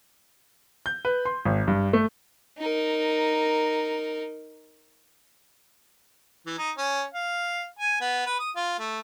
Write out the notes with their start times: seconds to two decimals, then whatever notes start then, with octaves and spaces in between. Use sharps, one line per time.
0.86 G6
1.05 B4
1.25 C6
1.45 G#1
1.68 G2
1.93 A3
2.58 D#4 A#4
6.46 E3
6.58 D#4
6.77 C#4
7.14 F5
7.79 G#5
8.00 B3
8.26 B4
8.39 D#6
8.55 F4
8.79 A3